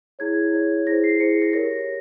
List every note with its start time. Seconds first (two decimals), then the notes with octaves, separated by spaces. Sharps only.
0.19 E4 G#4 C#5 G#6
0.52 E4 G#4 C#5
0.86 E4 G#4 C5 A#6
1.04 C7
1.20 E4 G#4 C5 C#7
1.42 A#6
1.53 G4 A#4 C#5 A#6